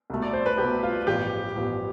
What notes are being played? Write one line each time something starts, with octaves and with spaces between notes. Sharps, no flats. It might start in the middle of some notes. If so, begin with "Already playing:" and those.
C2 B2 A3
D5
C5
B4
C2 B2 A3 G4
F4
A1 G2 F3 B3 G4
A1 G2 F3 B3